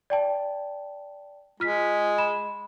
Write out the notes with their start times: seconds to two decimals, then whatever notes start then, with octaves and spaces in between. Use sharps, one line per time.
0.10 D5 G5 A5
1.60 G#3 F4 F6 B6
2.18 B5 E7